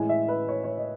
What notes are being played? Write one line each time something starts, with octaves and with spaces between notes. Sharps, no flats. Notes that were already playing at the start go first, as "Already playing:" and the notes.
Already playing: A2 E3 G#3 G#5
E5
B4
C#5
C#5
D#5